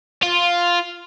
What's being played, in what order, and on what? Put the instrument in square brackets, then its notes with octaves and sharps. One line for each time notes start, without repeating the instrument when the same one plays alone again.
[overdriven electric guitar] F4